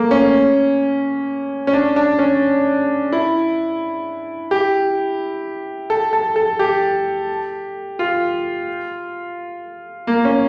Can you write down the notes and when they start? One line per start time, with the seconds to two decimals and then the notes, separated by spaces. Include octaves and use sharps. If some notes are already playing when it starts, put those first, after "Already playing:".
Already playing: A3 A#3
0.11 C#4
1.67 C#4
1.73 D4
1.96 D4
2.19 C#4
3.12 E4
4.51 G4
5.90 A4
6.13 A4
6.36 A4
6.59 G4
7.99 F4
10.07 A#3
10.25 C#4